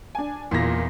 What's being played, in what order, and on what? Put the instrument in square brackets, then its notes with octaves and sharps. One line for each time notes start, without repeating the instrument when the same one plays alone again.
[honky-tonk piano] D4 G#5
[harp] E2 E4 F4 [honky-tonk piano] A#2 A#6